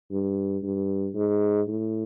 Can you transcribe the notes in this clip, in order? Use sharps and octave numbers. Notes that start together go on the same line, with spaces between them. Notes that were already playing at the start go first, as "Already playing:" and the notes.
G2
G2
G#2
A2